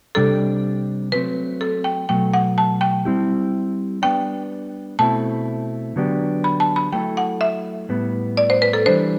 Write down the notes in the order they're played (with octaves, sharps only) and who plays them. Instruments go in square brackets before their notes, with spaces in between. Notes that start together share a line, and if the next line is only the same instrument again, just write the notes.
[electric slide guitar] C3 G3 D4 G4 [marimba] A4
[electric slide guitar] F#3 A3 C4 [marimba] B4
[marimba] A4
G5
[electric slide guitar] B2 F#3 A3 [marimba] G5
[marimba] F#5
A5
G5
[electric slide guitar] G3 C4 E4 G4
[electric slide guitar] G3 B3 D4 [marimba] G5
[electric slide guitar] B2 A3 C4 E4 [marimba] A5
[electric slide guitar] D3 F#3 B3 D4 G4
[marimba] B5
A5
B5
[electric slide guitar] F#3 A3 C4 E4 A4 [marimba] G5
[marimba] F#5
E5
[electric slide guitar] A2 G3 B3
[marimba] D5
C5
B4
A4
[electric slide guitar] E3 G3 D4 [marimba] C5